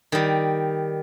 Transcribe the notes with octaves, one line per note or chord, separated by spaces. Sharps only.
D#3 G3